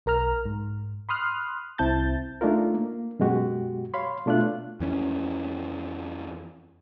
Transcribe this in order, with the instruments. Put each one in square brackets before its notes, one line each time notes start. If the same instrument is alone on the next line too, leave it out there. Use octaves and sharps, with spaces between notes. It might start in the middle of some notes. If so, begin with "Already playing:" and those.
[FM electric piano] B1 A#4 A#5 F6
G#2
B5 C6 D#6 F6 F#6
C2 C4 E4 A5 G6 A6
[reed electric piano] A3 D4 D#4 F4 A#4
A#3
F#2 B2 G#3 F#4 G4
C#5 F5 B5 C6
B2 A3 D4 F4 F#6
[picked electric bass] F2 E3 C#4